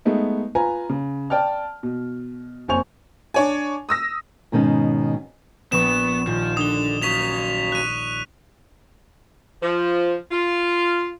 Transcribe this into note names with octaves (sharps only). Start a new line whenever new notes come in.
G#3 A3 B3 D#4
F4 B4 G#5 A#5
C#3
D5 G5 A5 F6
B2
F#1 F2 C5 G#5 C#6 F7
D4 C#5 G#5
D#6 E6 A#6
G#2 B2 D#3 C#4
A#1 B3 B5 C#6 E7
D#1 F3
D3 D#6 G7
C#3 F#3 C#6 B6 F7
F#6 D#7
F3
F4